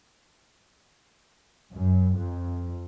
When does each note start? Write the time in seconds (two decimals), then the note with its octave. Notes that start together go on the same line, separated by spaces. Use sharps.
1.73 F#2
2.17 F2